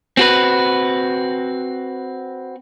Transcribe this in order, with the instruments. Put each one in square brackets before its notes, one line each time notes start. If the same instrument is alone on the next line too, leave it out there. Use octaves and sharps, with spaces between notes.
[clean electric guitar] C4 F#4 B4